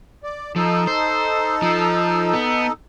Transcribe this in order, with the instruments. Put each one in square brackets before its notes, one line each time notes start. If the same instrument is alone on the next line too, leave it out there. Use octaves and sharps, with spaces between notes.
[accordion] D5
[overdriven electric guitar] F3 [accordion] D#4 A4
[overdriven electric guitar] C5
F3
B3